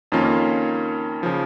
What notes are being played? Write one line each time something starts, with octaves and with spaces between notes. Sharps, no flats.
F2 D#3 A#3 C#4 F4
C#3 F3